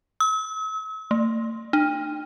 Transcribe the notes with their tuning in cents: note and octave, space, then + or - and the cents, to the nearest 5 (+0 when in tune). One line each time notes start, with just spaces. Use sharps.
E6 -40
A3 +45
D4 +40